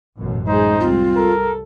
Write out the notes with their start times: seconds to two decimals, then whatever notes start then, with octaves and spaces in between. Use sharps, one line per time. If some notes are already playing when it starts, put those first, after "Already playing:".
0.17 A1 F#2 B2
0.48 G#3 D#4 G#4 C5
0.80 C2 C4 F4
1.16 A4 A#4